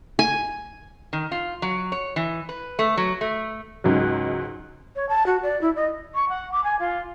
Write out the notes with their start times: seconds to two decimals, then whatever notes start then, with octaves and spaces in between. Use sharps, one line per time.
0.19 G#5
1.13 D#3
1.32 F4
1.62 F#3
1.92 C#5
2.16 E3
2.49 B4
2.79 A3
2.97 F#3
3.21 A3
3.84 C#2 G#2 F#3
4.96 C#5
5.09 A5
5.26 F#4
5.43 D5
5.62 E4
5.76 D#5
6.15 C#6
6.29 F#5
6.52 D6
6.64 G#5
6.80 F4